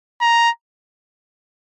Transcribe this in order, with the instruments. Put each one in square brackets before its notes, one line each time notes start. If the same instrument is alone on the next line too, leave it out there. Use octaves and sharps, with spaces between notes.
[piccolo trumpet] A#5